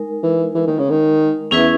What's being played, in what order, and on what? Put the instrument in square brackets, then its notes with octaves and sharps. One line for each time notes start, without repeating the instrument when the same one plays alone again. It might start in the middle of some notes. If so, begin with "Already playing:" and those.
Already playing: [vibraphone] G#3 D#4 A#4
[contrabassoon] E3
E3
D#3
C#3
D#3
[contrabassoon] E2 [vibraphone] C#4 E4 G#4 B4 E5